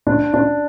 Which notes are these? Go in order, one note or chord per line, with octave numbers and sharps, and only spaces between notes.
D4
D4